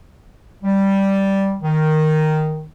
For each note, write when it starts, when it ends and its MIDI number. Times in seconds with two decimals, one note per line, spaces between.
0.63 1.55 55
1.62 2.66 51